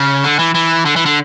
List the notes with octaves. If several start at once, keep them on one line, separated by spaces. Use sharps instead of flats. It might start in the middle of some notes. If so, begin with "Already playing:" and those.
Already playing: C#3
D3
E3
E3
D3
E3
D3